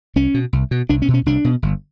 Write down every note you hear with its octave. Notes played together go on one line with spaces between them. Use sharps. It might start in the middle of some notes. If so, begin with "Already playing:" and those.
C2 C#4
B2
C2
B2
C2 D4
C#4
B2
C#4
C2 D4
B2
G1